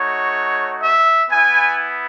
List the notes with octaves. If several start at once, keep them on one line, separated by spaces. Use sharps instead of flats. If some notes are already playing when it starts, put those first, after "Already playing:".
Already playing: A3 D#4 F#4 C#5
E5
B3 E4 G#5